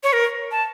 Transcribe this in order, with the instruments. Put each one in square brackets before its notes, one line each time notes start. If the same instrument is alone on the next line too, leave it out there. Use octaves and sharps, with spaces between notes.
[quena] C#5
A#4
A5